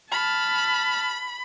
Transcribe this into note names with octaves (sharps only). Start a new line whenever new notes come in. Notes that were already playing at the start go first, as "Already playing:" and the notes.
A5 B5 F6